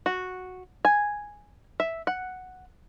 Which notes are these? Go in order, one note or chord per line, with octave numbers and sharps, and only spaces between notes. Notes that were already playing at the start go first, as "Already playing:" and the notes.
F#4
G#5
E5
F#5